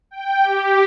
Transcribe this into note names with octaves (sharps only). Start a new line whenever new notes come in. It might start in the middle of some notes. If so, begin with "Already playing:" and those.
G5
G4